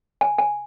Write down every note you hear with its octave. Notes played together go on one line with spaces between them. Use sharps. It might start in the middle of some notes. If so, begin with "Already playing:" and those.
G#5
G#5